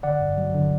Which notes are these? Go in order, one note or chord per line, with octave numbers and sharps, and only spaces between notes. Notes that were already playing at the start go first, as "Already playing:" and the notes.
D3 D5 F#5
G2
F#3
D3